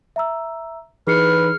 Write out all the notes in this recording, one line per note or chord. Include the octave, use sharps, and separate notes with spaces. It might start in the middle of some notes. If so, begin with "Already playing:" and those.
E5 A#5 E6
E3 D#4 G#4 B4 F6 C7 C#7